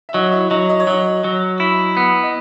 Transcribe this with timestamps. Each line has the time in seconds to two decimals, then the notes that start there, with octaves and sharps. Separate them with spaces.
0.09 E5
0.14 F#3 D#4 D#5
0.32 E4 E5
0.50 F#3 D#4 D#5
0.69 D#5
0.80 C#5
0.87 F#3 D#4 D#5
1.24 F#3
1.60 E4
1.97 B3
2.24 D#5